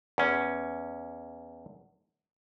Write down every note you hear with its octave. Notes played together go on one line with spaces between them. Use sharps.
E2 C#4